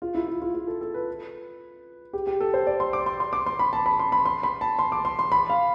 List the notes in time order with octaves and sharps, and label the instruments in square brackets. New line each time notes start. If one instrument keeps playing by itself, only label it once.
[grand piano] F4
E4
F4
F4
F4
A4
A4
B4
G4
G4
A4
C5
D5
C6
D6
C6
C6
D6
C6
B5
A5
B5
C6
B5
C6
B5
A5
C6
D6
C6
C6
B5
F5